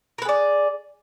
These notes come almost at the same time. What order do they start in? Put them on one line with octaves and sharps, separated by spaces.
A#4 B4 G#4 D5